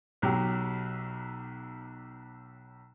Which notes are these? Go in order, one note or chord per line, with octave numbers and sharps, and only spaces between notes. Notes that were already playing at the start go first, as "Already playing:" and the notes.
B1 F#3 G4